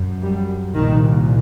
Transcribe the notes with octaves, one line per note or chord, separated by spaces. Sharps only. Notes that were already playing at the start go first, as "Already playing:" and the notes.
Already playing: F#2
G3
C2 A#2 D#3